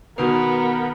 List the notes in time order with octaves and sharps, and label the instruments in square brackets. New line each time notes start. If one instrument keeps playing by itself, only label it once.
[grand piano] B2 D#3 [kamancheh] B3 A#4 [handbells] F#4 B4